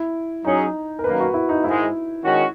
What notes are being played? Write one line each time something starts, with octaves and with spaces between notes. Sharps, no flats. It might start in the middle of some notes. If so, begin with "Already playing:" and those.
Already playing: E4
F#3 C#4 D#4 G#4
A#4
F#2 D#3 A#3 B4
F#4
E4
D#4
G#2 D#3 G#3 E4
D#3 G#3 C#4 F#4